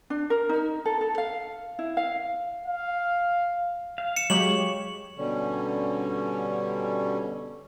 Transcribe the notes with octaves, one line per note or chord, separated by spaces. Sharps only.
D4
A#4
D#4
A4
A4
F5
E4
F5
F5
F5
C#7 E7
F#3 G#3 G4 C#5 F#7
B2 D3 G3 C#4